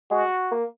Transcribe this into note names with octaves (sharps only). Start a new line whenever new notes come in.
G#3 F#4
A#3